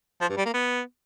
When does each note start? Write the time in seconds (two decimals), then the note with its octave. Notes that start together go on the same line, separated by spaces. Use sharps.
0.21 F3
0.29 G2
0.37 G3
0.45 A#3
0.54 B3